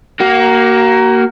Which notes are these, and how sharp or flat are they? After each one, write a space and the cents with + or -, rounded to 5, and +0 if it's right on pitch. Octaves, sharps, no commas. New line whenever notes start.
A#3 +0 F#4 +35